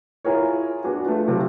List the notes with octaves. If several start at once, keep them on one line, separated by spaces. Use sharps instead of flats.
E4 F4 G#4 A#4 C#5
B3 D4 F#4 G#4
A3 F4
C3 F#3 C4 F4